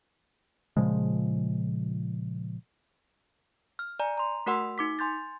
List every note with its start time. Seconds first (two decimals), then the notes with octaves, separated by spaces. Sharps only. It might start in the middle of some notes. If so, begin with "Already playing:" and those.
0.77 A#2 C#3 F3 G#3
3.79 F6
4.00 D5 G#5 A#5
4.18 A#5 C6
4.46 A3 F#4 A#4 F#5 C6 E6
4.78 D#4 D6 B6
4.99 G#5 C6 G6 A6